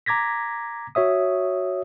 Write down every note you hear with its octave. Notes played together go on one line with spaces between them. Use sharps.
A#5 D6 G#6 A#6 B6
F#4 C#5 E5 D#6